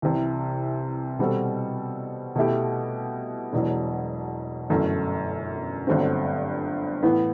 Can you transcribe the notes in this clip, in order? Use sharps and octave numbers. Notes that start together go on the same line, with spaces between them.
C2 C3 E3
B2 G3 C4 F#4 A4
B2 A3 E4 G4
E1 E2 B2 F#3
G1 F#2 E3 A3
G1 G2 F#3 A3 C4
A2 E3 B3